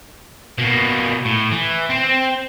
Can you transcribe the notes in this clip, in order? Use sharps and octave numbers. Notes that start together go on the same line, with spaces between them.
B2 A#3
A2
E3
C4